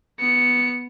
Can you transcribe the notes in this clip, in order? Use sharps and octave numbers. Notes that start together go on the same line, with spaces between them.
B3 C#7